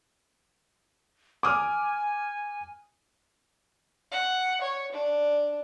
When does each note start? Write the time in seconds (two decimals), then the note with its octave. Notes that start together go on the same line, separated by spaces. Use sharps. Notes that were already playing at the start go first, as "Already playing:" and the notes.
1.43 G#5 D6 D#6 F6
4.11 F#5
4.61 C#5
4.92 D4